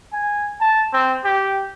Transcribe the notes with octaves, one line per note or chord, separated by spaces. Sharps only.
G#5
A5
C4
G4